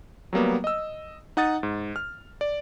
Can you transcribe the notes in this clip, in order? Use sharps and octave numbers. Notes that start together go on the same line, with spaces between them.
F#3 G3 A#3 B3
D#5 E6
D#4 F#5 D#6 A6
G#2
F6
D5